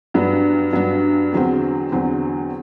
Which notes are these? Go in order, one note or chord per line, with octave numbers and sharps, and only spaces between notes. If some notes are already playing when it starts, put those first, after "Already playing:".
G2 F#3 B3 D4
G2 F#3 B3 D4
E2 D3 F#3 C4
E2 D3 F#3 C4